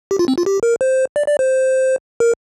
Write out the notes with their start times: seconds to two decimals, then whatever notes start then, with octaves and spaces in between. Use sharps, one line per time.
0.11 G4
0.19 F4
0.28 C4
0.38 F4
0.46 G4
0.63 A#4
0.81 C5
1.16 D5
1.28 D5
1.39 C5
2.20 A#4